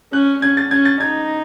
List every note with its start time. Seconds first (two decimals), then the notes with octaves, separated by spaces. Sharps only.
0.13 C#4 F#6
0.42 C#4 G#6
0.57 A6
0.71 C#4 G#6
0.85 A6
1.00 D#4 G#6